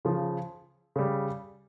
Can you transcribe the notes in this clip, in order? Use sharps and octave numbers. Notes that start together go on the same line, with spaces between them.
C#3 F3
C#3 G3